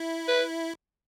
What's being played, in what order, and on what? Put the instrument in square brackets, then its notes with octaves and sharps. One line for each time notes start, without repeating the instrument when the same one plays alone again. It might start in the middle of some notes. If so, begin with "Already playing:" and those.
Already playing: [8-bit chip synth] E4
[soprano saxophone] B4